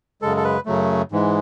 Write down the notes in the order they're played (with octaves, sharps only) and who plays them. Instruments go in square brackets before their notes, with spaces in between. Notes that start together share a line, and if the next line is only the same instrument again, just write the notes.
[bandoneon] F#2 C#3 G#3 A4
A4
B4
F#2 C#3 F#3 A3
G#2 E3 G#3